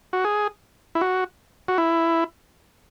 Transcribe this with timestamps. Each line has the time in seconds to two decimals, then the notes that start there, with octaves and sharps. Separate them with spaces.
0.13 F#4
0.24 G#4
0.95 E4
1.01 F#4
1.68 F#4
1.78 E4